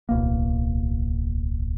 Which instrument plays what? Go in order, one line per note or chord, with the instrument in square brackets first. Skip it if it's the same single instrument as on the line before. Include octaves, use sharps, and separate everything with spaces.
[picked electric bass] D1 B1 A#3